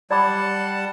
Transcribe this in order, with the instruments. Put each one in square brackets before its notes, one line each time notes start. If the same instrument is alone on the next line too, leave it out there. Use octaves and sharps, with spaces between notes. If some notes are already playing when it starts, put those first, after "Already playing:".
[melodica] G3 F#5 A5 [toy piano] D5 B5 D6